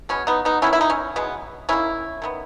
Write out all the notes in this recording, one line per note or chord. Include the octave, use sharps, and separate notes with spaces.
B2 G#3 B3 C#4
B3 D#4
B3 D#4
D#3 G#3 B3 C#4 E4
E4
D#4
C#4
B2 G#3 B3
D#3 A#3 C#4 E4
D#3 G#3 B3